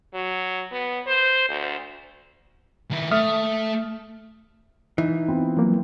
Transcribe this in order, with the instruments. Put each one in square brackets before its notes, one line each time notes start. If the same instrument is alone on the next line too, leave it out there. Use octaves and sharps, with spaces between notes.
[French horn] F#3
B3
C5
D2
[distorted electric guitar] D#3 E4
[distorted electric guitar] A3 [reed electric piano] E5 D#6 F6
[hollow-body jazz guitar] E3 [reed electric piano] D#4
[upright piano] B3 C4 F4
[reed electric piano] F3 F#3 A#3